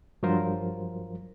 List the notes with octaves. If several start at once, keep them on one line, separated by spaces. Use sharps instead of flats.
G2 F3 F#3 F4 A#4 C5